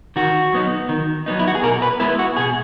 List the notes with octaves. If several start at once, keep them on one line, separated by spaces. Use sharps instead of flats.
D#3 F#4
F#3 B3 D#4
D#3
F#3 B3 D#4
E4
F#4
G#4
B2 A#4
B4
G#3 B3 E4 B4
F#4
B2 G#4